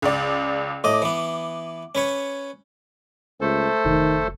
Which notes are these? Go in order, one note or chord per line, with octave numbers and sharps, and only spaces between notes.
C#2 D5
A2 D#5 D6
E3 B3
C#4 B4 C#5
C#2 A3 A4 C5
F1 D#3